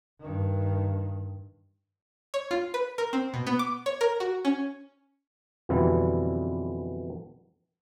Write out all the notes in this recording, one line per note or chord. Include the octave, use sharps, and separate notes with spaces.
G2 D#3
C#5
F4
B4
A#4
C4
B2
B3
D6
C#5
A#4
F#4
C#4
F2 B2 D3 E3 G3 E4